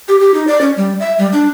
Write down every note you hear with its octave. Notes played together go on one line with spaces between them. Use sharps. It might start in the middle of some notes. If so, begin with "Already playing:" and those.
G4
G4
D#4
D5
C#4
G3
E5
G3
D4